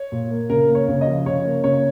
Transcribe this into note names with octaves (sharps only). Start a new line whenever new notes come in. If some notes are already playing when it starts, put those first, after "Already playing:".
Already playing: C#5
A#2
A#3
C#3 A#4
A#3
C#5
C#3
D#5
F3
C#3 C#5
A#3
C#3 C#5